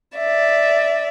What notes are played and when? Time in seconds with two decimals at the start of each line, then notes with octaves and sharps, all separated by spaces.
0.17 D5 E5